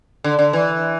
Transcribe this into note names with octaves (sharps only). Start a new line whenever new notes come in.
D3
D3
E3